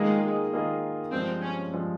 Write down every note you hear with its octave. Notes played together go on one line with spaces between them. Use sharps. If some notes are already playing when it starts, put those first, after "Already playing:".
Already playing: D#3 G#3 A#3 F4 G#4 D#5
D#3 A#3 F4 G#4 D#5
G2 F3 G#3 C4
C#4
G2 F3 G#3